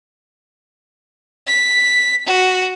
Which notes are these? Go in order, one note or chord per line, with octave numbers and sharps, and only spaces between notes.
B6
F#4